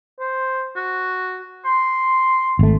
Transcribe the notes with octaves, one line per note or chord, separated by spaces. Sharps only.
C5
F#4
C6
G#1 A3